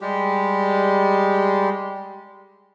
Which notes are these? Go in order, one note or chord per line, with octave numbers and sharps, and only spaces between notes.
G3 G#3 G4